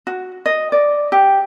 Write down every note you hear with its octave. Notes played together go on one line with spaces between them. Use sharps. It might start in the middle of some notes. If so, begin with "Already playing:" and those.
F#4
D#5
D5
G4